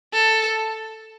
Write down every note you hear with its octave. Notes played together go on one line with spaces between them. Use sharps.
A4